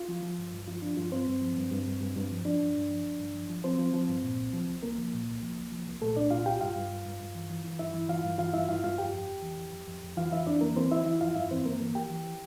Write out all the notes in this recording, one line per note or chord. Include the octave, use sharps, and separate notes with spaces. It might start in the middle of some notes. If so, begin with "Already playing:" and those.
Already playing: F4
F3
F3
G2
G2
F3 F4
F3 D4
G2 F3 F4
G2 C4 C5
G2
F3
G2
G2
G2
G2
G2
F3
F3 D4 D5
G2
G2
F3
F3
G2
F3
F3
F3 C4 C5
F3
F3
G2
A#2
C2
F3
C2
C2 A#3 A#4
F3
A#2
C2
F3
C2
F3
C2
A#2 A3 A4
C2 D4 D5
A#2 F4 F5
C2 G4 G5
G2 F4 F5
G2
G2
G2
G2
E3
E3
E3
G2 E4 E5
E3
E3 F4 F5
G2
E3 F4 F5
G2 E4 E5
G2 F4 F5
G2 F4 F5
F2 G4 G5
F2
F2
E3
F2
F2
F2
F2
E3 F4 F5
E3 E4 E5
F2 D4 D5
E3 A#3 A#4
E3 C4 C5
E3 E4 E5
E3 E4 E5
F2 F4 F5
G2 E4 E5
E3 C4 C5
G2 A#3 A#4
E3 A#3 A#4
E3 G4 G5
E3